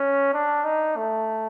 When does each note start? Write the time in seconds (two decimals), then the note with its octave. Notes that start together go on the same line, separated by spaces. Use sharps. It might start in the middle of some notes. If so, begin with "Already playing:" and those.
Already playing: C#4
0.34 D4
0.65 D#4
0.97 A3